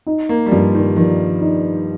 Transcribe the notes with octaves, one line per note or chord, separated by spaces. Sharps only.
D#4
A#3
G3
G2 F3
D#3
D#3 F3
D#4